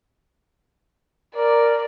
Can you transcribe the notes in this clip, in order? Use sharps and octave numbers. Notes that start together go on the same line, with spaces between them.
A#4 D5